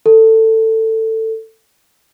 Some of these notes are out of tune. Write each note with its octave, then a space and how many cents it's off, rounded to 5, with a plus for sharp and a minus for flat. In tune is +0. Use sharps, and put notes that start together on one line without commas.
A4 +20